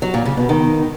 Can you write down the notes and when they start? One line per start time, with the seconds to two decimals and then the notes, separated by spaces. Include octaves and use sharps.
0.02 F#3
0.14 A#2
0.26 C#3
0.37 B2
0.49 D#3